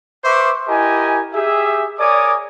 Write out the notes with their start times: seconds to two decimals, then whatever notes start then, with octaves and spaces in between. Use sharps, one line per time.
0.24 B4 C5 E5 C#6 D6
0.68 E4 G4 A#4 D#5 G#5
1.34 G4 G#4 E5
1.98 A#4 C#5 D5 G#5 D6 D#6